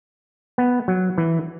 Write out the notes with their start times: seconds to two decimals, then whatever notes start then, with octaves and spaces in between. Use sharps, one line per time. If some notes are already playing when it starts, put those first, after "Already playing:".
0.58 B3
0.88 F#3
1.18 E3